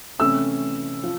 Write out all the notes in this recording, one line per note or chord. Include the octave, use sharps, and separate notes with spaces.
C3 E3 A3 C#4 E4 E6
F3